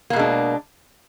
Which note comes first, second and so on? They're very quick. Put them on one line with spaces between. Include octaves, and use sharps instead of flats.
A#3 B2 G#3 D4